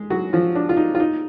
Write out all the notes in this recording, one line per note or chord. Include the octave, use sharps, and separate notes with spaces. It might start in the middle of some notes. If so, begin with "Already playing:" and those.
Already playing: G#3
F#3 F#4
F3 F4
D4
F4
D#4
F4
D#4